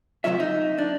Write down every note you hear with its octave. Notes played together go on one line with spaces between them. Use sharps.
D2 G2 C3 F#3 F4 E5
D#4
D4